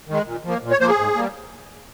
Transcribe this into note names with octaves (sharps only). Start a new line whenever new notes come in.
D#3 G#3
A#2
F3 A#3
A#2
C#5
F3 A#3 C5
G#4
G#2
G3 A#3